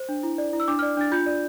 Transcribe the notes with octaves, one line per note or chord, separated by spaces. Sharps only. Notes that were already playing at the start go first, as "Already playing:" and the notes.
Already playing: C5
D4
E4
D5
E4
E6
D4 D6
D5 F6
D4 A6
F4 G6
D5